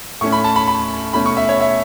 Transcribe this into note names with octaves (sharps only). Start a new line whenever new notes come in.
A2 A3 C#4 C#6
B5
A5
B5
B5
B2 A3 C#4 B5
C#6
E5
C#5
E5